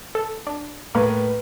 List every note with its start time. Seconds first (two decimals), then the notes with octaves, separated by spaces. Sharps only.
0.15 A4
0.47 D4
0.95 A2 A#3 A#4 B4